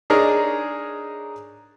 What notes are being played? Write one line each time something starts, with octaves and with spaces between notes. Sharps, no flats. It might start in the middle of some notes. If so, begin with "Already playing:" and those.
D4 D#4 G#4 A#4 C#5 D#5